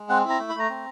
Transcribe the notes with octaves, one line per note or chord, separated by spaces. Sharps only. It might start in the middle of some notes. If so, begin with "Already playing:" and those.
Already playing: G#3
C4 F#5
E4
A#5
A3
B5
A3 A#5
C4